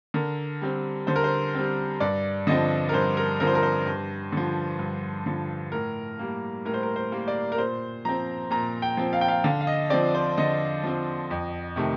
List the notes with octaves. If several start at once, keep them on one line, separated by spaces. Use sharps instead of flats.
D3 A#4
G3 C4
D3 C5
A#4
C5
G3 C4
G2 D5
D3 F3 C4 D#5
A#4
G2 C5
A#4
D3 F3 C4 A#4
C5
A#4
C5
G2
D3 F3
G2
D3 F3
A2 A#4
G3 A#3
A2 A#4
C5
A#4
C5
G3 A#3
D5
A#4
A#2 C5
F3 C4 A#5
A#2 A#5
G5
F3 C4
F5
G5
F5
D3 F5
F5
D#5
F3 C4 D5
C5
D3 D#5
F3 C4
F2
C3 D#3 A3